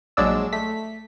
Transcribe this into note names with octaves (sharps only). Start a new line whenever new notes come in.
A#1 F#3 G#3 D4 D5 E6
A3 B6